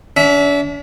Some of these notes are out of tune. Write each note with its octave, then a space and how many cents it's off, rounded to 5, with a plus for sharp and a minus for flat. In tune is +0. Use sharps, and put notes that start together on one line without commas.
D4 -45 E5 -5